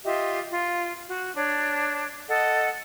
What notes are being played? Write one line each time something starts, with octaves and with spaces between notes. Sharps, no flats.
F4 G4 D#5 E5
F4
F#4
D4 C#5
A4 D#5 F#5